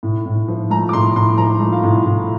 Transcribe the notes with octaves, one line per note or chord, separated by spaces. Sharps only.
A2
A2
F3
A3 A#5
D6
A2 C6
A2 C6
F3 A#5
A3
F5
A2
A2